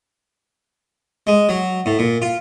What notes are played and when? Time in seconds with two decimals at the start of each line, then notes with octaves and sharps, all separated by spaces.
1.27 G#3
1.49 F#3
1.86 A2
1.99 A#2
2.22 F4